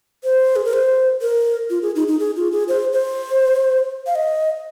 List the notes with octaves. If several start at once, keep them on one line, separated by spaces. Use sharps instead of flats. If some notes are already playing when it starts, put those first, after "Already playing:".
C5
G#4
A#4
C5
A#4
F4
G#4
D#4
D#4
G#4
F4
G#4
C5
C5
F5
D#5